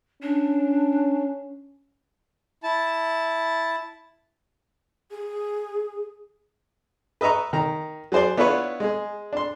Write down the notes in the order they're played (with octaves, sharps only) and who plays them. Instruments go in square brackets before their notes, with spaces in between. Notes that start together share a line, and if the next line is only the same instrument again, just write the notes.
[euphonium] C#4 [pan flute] D4
[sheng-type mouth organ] E4 A5
[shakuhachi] G#4
[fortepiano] B4 D#5 E5 A#5 C#6
D#3 A#5
F#3 G#4 C5 D5 C6
B3 D4 E4 F4 B4 C#5
G#3 G#4
D4 C6